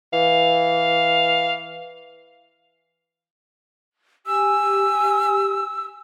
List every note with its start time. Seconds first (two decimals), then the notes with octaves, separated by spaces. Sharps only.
0.13 E3 F5
4.26 G4 G#5 E6